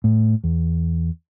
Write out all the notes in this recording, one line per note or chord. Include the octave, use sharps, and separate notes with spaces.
A2
E2